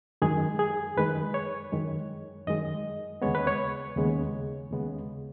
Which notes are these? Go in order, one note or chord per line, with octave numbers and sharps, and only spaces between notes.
F#2 D#3 G#3 G#4
G#4
F#2 D#3 G#3 B4
C#5
F#2 D#3 G#3
F#2 D#3 G#3 D#5
D#2 C#3 G#3 B3 C#5
B4
C#5
D#2 C#3 G#3 B3
D#2 C#3 G#3 B3